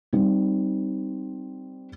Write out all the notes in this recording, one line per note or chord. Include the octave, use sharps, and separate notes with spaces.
G3 C4 D#4